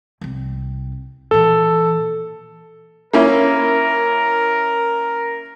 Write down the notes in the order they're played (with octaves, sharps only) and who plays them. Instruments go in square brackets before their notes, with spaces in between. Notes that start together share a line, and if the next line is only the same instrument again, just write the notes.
[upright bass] C2 C4
[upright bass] A#2 E3 [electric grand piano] A4
[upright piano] A#3 C#4 E4 [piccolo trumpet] A#4